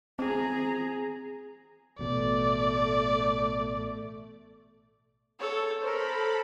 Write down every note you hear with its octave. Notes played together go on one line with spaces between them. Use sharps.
C4 G#4 A#5
A1 B2 A3 D5
A4 C#5
A4 A#4 C5 B5